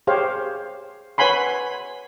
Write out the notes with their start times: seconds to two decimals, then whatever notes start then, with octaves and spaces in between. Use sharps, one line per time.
0.07 G4 G#4 C5 C#5 F5
1.18 B4 C#5 F#5 G#5 B5 C6